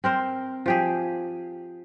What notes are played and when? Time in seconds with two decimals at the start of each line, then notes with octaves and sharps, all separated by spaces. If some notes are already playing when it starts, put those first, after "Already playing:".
0.04 C4 A#4 C5
0.66 F3 G4 G#4